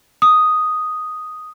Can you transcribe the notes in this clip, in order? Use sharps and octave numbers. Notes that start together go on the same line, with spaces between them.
D#6